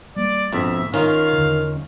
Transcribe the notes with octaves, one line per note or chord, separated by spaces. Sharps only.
G3 A#3 D5
A#1 F2 G#2 B2 A#3 B3 E5
D#3 C#4 D#4 F4 F5
E2 D3